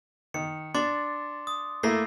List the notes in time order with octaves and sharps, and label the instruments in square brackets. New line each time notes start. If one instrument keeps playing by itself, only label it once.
[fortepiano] D#3 [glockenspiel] C#7
[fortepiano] D4 [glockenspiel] C6 D6 A6
[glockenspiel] D#6
[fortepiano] A3 A#3 E4 [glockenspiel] A#6 C7